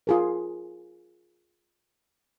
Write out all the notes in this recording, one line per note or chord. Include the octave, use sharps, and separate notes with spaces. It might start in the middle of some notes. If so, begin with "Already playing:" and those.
F4 G#4 A#4